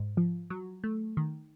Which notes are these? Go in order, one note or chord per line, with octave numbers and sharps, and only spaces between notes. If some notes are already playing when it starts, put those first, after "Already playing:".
Already playing: G#2
F3
F#3
A3
D#3